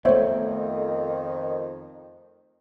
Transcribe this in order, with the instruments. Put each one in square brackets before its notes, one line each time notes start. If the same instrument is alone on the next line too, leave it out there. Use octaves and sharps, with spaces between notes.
[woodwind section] F2 D#3 [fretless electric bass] A3 B3 [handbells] C5 C#5 E5